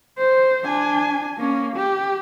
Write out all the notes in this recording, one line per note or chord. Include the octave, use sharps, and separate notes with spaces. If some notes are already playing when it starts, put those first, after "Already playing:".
C5
D4 G#5
A#3 C#4
G4